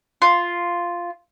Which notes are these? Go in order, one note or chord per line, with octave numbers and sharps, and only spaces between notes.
F4